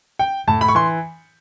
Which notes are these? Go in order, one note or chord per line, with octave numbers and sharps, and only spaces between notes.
G5
A2 A5
B5
C#6
E3 C6